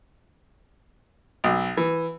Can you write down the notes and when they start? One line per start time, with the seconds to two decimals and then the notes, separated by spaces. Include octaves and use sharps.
1.44 B1
1.77 E3